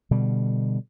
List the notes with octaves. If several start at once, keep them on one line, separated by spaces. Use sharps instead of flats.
B2 D3 G3